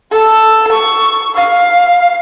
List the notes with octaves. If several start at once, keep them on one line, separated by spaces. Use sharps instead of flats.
A4
C#6
F5